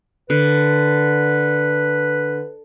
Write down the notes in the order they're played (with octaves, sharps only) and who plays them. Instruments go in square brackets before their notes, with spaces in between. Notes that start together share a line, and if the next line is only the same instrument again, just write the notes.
[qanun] D3 [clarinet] B4